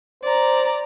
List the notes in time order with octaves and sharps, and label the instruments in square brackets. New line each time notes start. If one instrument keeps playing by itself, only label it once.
[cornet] C5 [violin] D5 A#5